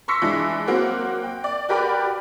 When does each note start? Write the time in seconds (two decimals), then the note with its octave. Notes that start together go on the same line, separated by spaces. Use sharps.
0.08 C6 C#6 E6 A#6 B6 C#7
0.22 E3 G#3 D4
0.67 F#3 A#3 C4 F#4
1.23 G5
1.44 D5
1.69 F#4 G4 A#4 B4 D5 G5